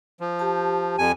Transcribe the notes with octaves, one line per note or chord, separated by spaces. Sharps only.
F3
G4 A5
F2 G#5